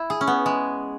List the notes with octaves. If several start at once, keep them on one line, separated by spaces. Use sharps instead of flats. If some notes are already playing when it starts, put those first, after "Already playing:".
Already playing: E4
G#4
C#4
B3
G#3